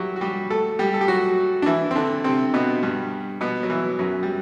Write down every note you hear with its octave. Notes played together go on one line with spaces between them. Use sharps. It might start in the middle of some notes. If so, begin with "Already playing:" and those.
Already playing: F#3 G3 E4 F#4 G4
F#4
G3 G4
A3 A4
G3 G4
A4
G4
F#3 F#4
D4
E3 E4
C4
D3 D4
C3 C4
B2 B3
G2 G3
B2 B3
F#3
E3
F#2 F#3
G3